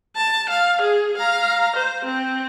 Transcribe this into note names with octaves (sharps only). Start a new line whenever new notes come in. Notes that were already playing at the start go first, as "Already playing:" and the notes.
A5
F5
G#4
F5 A#5
C5
C4